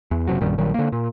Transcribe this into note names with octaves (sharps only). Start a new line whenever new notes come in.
E2
F#1 C3 F#3
A#1 F#2 D#3 G3
A#1 D#3 F#3 G3
D3 A#3
A#2